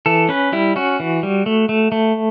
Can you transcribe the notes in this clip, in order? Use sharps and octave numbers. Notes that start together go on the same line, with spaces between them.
E3 A4
C#4 B4
G3 E4
C#4 F#4
E3
G3
A3
A3
A3